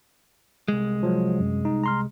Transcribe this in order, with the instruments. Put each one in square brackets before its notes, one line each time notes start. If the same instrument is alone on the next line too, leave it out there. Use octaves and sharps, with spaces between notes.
[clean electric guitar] C2 G#3
[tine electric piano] F3 F#3
F#2
D#4
A#5 C6 F6